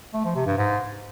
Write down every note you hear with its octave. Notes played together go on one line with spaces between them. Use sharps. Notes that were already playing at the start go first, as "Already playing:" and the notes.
A3
F3
C3
G2
G#2